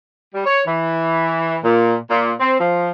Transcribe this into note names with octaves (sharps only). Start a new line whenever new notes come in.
G3
C#5
E3
A#2
A#2
C4
F3